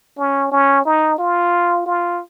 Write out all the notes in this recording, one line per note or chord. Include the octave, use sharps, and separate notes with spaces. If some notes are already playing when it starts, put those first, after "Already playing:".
C#4
C#4
D#4
F4
F4